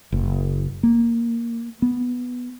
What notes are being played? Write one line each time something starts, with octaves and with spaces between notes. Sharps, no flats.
F#1
A#3
B3